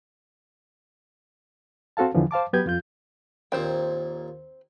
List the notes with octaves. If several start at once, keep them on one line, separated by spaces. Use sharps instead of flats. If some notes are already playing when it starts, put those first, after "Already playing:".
C4 F#4 A4 F5 A5
E2 D3 E3 F3
C5 F5 A5 D6
F#3 B3 G4 B4 G6 G#6
F2 F4 G6
D#2 A#2 C4 C5 G5